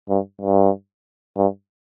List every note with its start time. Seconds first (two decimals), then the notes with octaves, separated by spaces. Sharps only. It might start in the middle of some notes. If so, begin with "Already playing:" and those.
0.09 G2
0.41 G2
1.37 G2